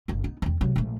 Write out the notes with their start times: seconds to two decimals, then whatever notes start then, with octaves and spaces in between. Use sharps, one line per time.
0.08 F#1 D3
0.24 B3 D#4
0.42 E2 C4
0.61 C3 F#3
0.76 A#1 A3